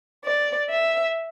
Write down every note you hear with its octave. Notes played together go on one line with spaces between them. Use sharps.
D5
E5